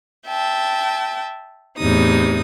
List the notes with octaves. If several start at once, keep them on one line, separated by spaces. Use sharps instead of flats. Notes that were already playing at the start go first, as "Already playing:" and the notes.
E5 G5 A5
E2 A2 C3 D#4 D#6